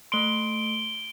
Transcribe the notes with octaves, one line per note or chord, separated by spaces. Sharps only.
A3 C6 D7 G7